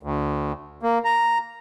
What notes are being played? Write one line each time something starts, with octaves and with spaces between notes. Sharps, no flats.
D2
A#3
A#5